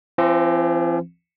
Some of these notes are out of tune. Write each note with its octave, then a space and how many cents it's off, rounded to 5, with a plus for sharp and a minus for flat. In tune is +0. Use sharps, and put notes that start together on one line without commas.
F3 -45 C4 +15